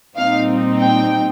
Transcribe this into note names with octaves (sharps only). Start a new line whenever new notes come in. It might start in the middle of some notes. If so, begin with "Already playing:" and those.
A#2 G3 C4 D#4 F5
G5